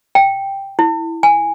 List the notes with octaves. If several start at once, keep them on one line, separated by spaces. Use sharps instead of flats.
G5
E4
G#5